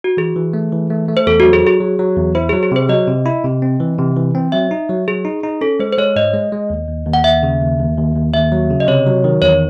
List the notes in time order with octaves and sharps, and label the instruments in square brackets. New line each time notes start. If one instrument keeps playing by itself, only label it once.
[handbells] F#4
[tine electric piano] E3 [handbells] G#4
[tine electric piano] E3
A3
E3
A3
A3
[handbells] C5
[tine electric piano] E2 [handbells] A4
[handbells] F#4
[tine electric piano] F#3
[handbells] G#4
[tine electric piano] F#3 [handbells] G#4
[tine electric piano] F#3
F#3
E2
[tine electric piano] E4 [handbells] C5
[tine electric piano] F#3 [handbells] G#4
[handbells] G#4
[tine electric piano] C3 [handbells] C5
[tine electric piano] F#3 [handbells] D#5
[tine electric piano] C3
E4
C3
C4
E3
C3
E3
C4
[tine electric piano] F#3 [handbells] E5
[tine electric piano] D#4
F#3
[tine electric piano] F#3 [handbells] G#4
[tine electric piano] D#4
D#4
[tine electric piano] C#4 [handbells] A4
[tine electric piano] G#3 [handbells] C5
[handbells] C5
[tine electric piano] G#3 [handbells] C#5
[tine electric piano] G#2 [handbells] D#5
[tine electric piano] G#3
G#3
D#2
D#2
D#2
[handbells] F#5
[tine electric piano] D#2 [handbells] E5
[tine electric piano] C#3
D#2
D#2
D#2
D#2
[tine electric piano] D#2 [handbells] E5
[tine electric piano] F#3
C#3
[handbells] D#5
[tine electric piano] C3 [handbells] C#5
[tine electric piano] F#3
D#3
[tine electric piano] E2 [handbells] C#5